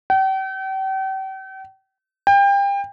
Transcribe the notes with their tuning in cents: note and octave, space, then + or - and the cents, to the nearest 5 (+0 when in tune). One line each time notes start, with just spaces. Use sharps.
G5 -40
G5 +30